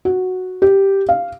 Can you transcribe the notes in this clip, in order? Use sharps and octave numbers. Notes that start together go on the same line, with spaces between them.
F#4
G4
F5